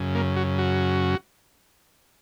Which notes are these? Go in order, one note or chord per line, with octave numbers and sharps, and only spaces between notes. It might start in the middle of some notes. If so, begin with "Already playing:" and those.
Already playing: F#2 C#3
A#3
F#4
F#4